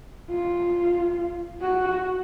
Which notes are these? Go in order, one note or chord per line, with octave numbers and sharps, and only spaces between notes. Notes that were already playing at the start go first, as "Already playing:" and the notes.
F4
F#4